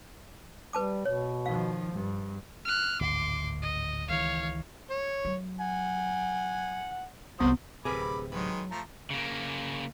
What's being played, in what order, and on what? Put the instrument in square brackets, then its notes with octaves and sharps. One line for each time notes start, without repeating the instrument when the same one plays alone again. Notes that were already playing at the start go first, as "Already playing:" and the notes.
[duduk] G3 [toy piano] B4 A5 D6
[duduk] B2 [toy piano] C#5
[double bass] D#3 F3 [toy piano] F5
[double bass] G2
[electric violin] F6 F#6
[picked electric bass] D1 G#1 D2 [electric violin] C6 D6
[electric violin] D#5
[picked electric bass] C#2 D#3 E3 [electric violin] C#5 F5
[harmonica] C#5
[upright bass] F#3
[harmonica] F#5 G#5
[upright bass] C2 F3 [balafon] B3 [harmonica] F#4 C5 D#6
[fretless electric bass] D1 C3 [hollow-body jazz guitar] G#4 A#4 B4 [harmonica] B5 D6
[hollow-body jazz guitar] D#2 F#3 [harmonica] D#3 G#3 B4
[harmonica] F3 A3 A#5
[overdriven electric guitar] C#3 A#3